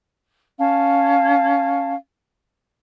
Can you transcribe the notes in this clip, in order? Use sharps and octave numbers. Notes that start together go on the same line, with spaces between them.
C#4 F5 A5